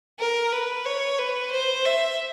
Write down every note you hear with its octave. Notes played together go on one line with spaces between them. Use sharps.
A#4
B4
C#5
B4
C5
E5